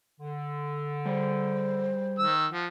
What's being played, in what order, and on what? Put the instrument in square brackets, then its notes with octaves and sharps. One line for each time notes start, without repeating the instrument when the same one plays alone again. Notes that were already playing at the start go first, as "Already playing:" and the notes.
[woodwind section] D3
[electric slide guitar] G3 G#4 D5 [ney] C5
[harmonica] D#3 E6
[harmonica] F3 [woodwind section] F#5